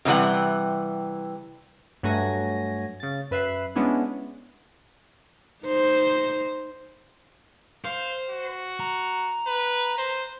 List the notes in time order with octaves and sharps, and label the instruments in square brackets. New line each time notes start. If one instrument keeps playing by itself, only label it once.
[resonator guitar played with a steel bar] F#2 C3 E3 G3 F#5
[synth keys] G2 F#3 A3 F#4 G#5 A#6
C#3 A6
F#2 B4 E5 F#6 C7
G#3 B3 C#4 D4 E4
[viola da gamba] D#4 C5
[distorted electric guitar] C5 [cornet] F5
[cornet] F#4
[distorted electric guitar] A#5
[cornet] B4
C5